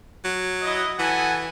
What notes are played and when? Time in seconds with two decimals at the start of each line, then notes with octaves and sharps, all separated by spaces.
0.24 F#3
0.63 E4 D#5
0.99 E3 A4 F#5 G#5